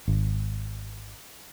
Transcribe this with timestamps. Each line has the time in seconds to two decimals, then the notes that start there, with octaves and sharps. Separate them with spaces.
0.08 G#1